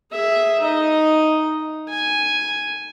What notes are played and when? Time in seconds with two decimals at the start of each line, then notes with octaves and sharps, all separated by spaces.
0.12 G#4 E5
0.60 D#4 D#5
1.90 G#5